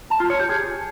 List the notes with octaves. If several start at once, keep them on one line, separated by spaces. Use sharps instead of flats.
A5
F4
C#5
G4
G#4